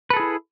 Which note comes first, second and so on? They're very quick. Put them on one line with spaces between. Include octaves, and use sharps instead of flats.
B4 A4 G#4 E4